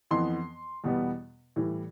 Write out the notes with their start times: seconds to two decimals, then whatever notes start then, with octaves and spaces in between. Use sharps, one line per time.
0.11 F2 E3 B3 C6
0.84 E2 B2 G3 B3
1.56 A2 E3 G3